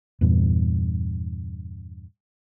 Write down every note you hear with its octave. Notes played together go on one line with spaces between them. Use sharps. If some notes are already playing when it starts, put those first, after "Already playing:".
E2 G2 A#2